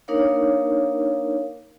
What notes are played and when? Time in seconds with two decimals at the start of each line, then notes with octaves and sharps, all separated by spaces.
0.08 A#3 D4 D#4 A#4 C#5 F5